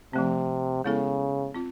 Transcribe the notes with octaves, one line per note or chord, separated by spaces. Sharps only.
C3 F3 A3 C4
C#3 G#3 B3 E4 A4
C4 F4